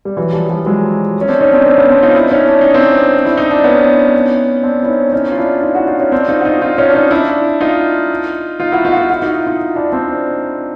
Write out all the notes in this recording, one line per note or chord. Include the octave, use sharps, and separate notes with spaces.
G3
E3 F#3
F3 G3
F3 G3
F#3 G#3
C#4
C4 D4
C#4 D#4
C4 D4
C4 D4
B3 C#4
C4 D4
D#4 F4
D4 E4
C#4 D#4
D4
D#4
C4 D4
E4
D#4
D4
B3 C#4
C4 D4
E4
C#4 D#4
C#4 D#4
F4
D4 E4
D#4 F4
E4 F#4
D#4 F4
C#4 D#4
C4 D4
D#4 F4
F#4
D#4 F4
D#4 F4
C#4 D#4
D4
C#4 D#4
D4 E4
D#4 F4
D#4 F4
E4 F#4
D#4 F4
F#4
D#4 F4
E4 F#4
D#4 F4
D#4 F4
D4 E4
C4 D4